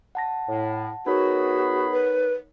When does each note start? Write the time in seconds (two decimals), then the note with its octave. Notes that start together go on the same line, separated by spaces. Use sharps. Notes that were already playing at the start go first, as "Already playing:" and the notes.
0.15 F#5 A5 A#6
0.49 A2
1.06 B3 D#4 F#4 G#4 A#4 C#5 B5
1.92 B4